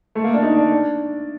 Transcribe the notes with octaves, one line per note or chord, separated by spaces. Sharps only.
A3
A#3
D4
D#4
D4
D4